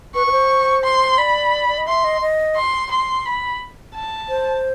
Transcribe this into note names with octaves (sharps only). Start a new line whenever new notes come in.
B4 C#6
B4
C5
C6
D5 B5
D5
D#5
E5 C6
D#5
D#5
C6
C6
B5
A5
C5